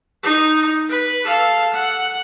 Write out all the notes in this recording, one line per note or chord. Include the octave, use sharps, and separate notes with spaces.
D#4
B4
A4 F5
F#5